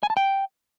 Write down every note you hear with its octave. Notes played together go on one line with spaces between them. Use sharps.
G#5
A5
G5